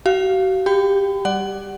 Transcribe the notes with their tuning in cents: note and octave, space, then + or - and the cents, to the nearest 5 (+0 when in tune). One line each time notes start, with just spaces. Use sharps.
F#4 +45 F5 +0
G4 +15 G5 +0 B5 +40
G3 +0 D5 +10 F#5 +20